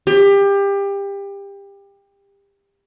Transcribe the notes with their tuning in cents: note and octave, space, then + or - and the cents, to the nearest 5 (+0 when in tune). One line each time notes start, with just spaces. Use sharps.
G4 +25